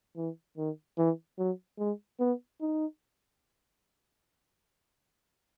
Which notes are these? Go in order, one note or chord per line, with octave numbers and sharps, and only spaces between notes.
E3
D#3
E3
F#3
G#3
B3
D#4